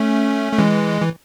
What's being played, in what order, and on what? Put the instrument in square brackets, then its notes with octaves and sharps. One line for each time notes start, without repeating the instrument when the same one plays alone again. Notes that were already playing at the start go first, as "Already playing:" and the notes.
Already playing: [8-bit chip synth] A3 C#4
A3
E3 G#3
E3